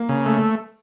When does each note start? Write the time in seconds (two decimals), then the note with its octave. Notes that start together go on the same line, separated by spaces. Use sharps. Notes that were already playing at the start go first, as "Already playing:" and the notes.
Already playing: A#3
0.09 C#3
0.26 A3